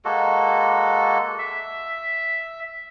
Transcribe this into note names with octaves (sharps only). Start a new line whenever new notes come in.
G#3 A#3 F#4 A4
E5